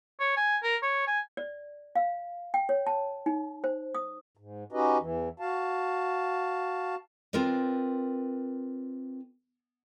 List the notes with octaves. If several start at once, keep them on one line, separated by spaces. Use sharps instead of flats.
C#5
G#5
A#4
C#5
G#5
D5
F5
G5
C#5
A5
D#4
C5
D#6
G#2
C#4 D#4 F#4 G4 B4 D#5
E2 E3
F#4 F5 A5
C4 F4 A#4 B4 D5